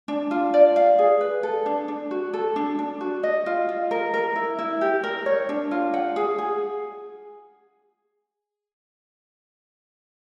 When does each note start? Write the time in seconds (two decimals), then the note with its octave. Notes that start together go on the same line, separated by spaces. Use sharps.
0.08 D4
0.31 F4
0.54 D5
0.76 F5
0.99 G#4
1.21 B4
1.43 A4
1.66 D4
1.88 D4
2.11 F#4
2.33 A4
2.56 D4
2.79 D4
3.01 F#4
3.23 D#5
3.46 F4
3.69 F4
3.91 A#4
4.14 A#4
4.36 E4
4.59 E4
4.81 G4
5.04 A#4
5.26 C#5
5.49 D4
5.71 F4
5.94 F#5
6.16 G#4
6.38 G#4